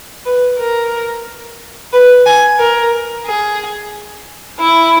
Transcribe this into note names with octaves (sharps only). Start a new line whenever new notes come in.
B4
A#4
B4
G#5
A#4
G#4
E4